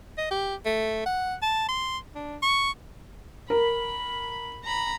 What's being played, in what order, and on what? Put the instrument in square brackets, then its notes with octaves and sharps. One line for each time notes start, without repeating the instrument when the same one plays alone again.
[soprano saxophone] D#5
G4
A3
F#5
A5
C6
D4
C#6
[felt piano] A#4 [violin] B5
[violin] A#5 B5